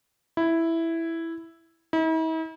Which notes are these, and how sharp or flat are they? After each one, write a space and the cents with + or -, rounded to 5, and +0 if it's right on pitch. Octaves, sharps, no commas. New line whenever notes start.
E4 +0
E4 -45